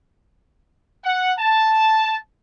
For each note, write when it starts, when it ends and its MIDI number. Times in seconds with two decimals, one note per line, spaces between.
1.04 1.32 78
1.38 2.17 81